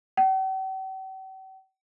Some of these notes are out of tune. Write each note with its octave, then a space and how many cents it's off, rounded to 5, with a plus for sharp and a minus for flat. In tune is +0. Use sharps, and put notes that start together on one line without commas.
G5 -45